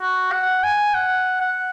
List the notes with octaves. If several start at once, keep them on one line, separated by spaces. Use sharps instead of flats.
F#4
F#5
G#5
F#5
F#5